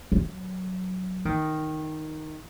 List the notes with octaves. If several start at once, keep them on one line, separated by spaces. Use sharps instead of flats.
F#3
D#3